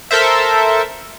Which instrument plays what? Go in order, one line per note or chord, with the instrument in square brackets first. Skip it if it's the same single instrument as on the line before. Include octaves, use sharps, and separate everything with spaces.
[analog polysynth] A4 A#4 C5 E5